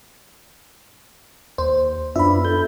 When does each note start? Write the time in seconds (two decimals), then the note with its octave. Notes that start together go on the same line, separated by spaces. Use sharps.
1.58 D#2 C5
2.16 F#2 B3 D4 F4 E5 B5
2.45 A4 G6